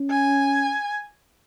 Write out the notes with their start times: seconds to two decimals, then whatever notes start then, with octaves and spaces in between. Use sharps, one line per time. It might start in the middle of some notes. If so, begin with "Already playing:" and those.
Already playing: C#4
0.10 G#5